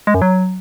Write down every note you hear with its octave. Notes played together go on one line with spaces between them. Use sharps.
G#3
F#2
F#3